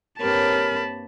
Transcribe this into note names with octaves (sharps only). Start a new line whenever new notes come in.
G2 A#3 C4 G4 A#4 C#5 A5 B5